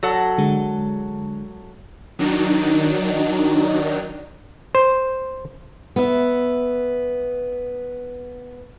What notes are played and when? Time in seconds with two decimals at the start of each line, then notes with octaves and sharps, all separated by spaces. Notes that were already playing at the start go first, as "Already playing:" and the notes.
0.03 F#3 A4 F#5 A#6
0.38 D3 G#3
2.19 D#3 F#3 D4 D#4
4.75 C5
5.96 B3 E5